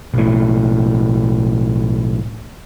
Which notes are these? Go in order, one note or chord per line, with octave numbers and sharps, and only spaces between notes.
B1 A2